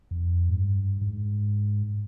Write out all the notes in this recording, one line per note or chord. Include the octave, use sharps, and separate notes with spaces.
F2
G#2
G2
G#2